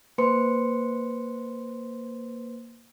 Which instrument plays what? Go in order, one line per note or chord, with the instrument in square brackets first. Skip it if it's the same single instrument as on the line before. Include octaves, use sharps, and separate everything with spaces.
[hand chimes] A#3 B4 C5 C6 C#7